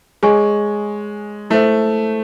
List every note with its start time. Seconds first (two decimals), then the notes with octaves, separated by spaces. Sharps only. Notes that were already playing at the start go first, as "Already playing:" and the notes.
0.23 G#3 G#4 C#5 G#5 C#6
1.50 A3 E4 A4 C5 E5